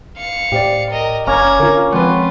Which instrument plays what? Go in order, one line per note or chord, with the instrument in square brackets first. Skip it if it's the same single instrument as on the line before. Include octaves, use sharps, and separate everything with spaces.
[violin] F5 C#7
[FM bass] A2 [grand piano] G4 C5 D5
[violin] A#4 D#5
[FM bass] F#1 [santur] A#3 C#4 [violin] A#5 G#6
[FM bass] D3 [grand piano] F4 A#4
[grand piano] F3 C4 C#4 [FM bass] G#3 [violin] F4 [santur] B4 F#5